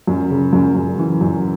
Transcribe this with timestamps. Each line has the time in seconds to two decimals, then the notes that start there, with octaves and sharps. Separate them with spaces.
0.07 F#2
0.30 C#3
0.53 F#2
0.75 F#2
0.98 E3
1.21 F#2